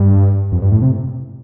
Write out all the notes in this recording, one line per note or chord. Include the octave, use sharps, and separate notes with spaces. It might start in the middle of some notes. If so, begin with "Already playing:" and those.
Already playing: G2
F2
G2
A2
C3